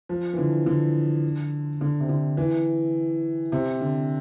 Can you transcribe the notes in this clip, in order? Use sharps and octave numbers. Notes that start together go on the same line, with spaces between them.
F3
E3
D3
D3
D3
C3
D3
E3
C3
D3